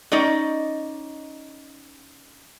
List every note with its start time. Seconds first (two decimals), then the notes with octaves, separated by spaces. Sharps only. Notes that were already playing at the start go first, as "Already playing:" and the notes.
0.12 C#4 D#4 D5 D#5